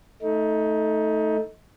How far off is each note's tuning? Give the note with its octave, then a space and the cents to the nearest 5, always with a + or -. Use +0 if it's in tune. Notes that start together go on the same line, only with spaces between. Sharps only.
A3 +0 D#4 +20